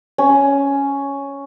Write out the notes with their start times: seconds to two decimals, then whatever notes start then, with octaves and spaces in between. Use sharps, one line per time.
0.18 C#4